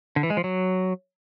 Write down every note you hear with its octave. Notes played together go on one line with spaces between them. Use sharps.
D3
E3
G#3
F3
F#3